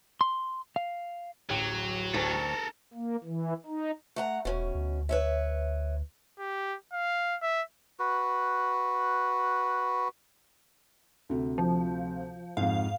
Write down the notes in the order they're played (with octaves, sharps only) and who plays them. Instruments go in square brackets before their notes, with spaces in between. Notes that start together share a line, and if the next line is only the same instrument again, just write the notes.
[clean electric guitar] C6
F5
[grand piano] D1 A1 G5 [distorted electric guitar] F#3
[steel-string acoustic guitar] D2 [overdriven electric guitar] A4 A#4
[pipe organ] A#3
E3
D#4
[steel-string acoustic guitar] A3 F#5 A#5
[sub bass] D#1 [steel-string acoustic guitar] B2 C#4
[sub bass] D2
[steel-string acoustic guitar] B4 C#5 E5
[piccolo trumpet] G4
F5
E5
[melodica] F#4 B4
[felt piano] D2 C3
[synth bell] F3
[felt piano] F2 G#2 [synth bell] F5